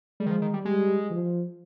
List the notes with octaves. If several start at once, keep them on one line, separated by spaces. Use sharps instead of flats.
G3 G#3
D#3
F3
D#3
G3
G3 G#3
F3